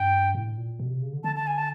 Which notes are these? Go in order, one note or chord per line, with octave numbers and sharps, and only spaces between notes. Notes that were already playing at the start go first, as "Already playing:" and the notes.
Already playing: G2 G5
A2
A#2
B2
C3
C#3
D3
D3 A5
A5
G#5
A5